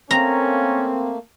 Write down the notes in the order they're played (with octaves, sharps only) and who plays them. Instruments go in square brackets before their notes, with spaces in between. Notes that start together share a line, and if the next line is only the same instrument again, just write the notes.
[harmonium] A3 A#3 [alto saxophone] C4 [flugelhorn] C#4 [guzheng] A#5